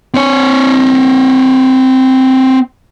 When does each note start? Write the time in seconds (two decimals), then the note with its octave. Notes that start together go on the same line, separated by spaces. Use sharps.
0.14 C4 C#5